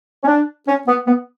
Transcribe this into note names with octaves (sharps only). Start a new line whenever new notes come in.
C#4
D4
C#4
B3
B3